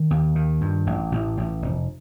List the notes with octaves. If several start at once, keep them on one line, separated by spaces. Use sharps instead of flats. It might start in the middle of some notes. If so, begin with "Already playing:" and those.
Already playing: D#3
D#2
D#3
G2
A1
A1
A1
F1